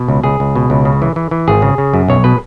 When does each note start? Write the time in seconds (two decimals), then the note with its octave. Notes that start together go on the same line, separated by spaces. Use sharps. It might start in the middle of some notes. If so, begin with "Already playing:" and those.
Already playing: B2
0.08 C#2
0.24 C#2 G#4
0.40 C#2
0.56 B2
0.70 C#2
0.85 C#3
1.02 E3
1.16 E3
1.31 E3
1.48 G#1 G#4
1.62 C#3
1.78 C#3
1.94 F#2
2.08 B1 C#5
2.24 B2 B4